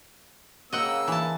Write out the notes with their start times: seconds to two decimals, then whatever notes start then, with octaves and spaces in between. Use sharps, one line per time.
0.72 C#3 A#3 D#5 F#5 G5 E6
1.08 E3 A5